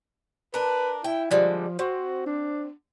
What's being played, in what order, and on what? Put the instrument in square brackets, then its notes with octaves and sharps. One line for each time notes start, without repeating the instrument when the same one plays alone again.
[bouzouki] D4 A#4 [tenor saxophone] B4
[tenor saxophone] E4 [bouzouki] G5
[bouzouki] D3 G3 G#3 [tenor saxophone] F3
[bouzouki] C4 [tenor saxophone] F#4
[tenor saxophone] D4